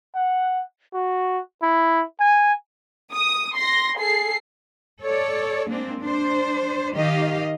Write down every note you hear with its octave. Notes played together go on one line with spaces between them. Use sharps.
F#5
F#4
E4
G#5
D#6
C6 A#6
G#4 A4 C7
A4 C#5 D5
G#3 A#3 C4 D4
D4 C5
D#3 G4 D#5 F5